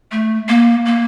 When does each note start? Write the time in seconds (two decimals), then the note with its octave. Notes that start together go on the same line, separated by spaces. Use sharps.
0.12 A3
0.48 A#3
0.86 A#3